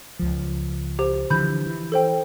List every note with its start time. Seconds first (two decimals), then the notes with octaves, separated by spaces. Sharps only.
0.19 C#2 F3
0.99 G4 C5
1.30 D3 E3 F3 B5 G6
1.66 E3
1.92 A4 C5 G5